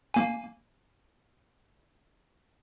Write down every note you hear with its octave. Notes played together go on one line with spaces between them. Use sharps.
A#3 G#5